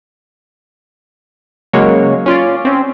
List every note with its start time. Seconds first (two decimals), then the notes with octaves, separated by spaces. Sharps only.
1.73 C#3 F#3 G#3 A#3 C#5
2.26 C#4 F4 D5
2.65 C4 C#4